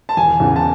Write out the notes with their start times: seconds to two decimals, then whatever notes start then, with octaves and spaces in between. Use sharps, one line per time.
0.09 A5
0.17 E1 G#5
0.40 E2 C#3 E3
0.56 A5